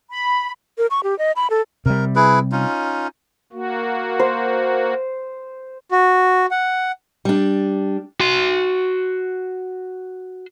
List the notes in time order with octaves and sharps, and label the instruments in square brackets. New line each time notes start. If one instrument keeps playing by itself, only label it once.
[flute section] B5
[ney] A#4
C#6
G4
D#5
B5
A4
[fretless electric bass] C3 G3 [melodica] A#4
[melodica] E4 G#4 B4
C#4 D#4 F4
[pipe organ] A#3 F#4
[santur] C5
[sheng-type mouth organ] F#4
F#5
[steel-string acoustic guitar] G3 D4
[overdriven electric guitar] F#4 C6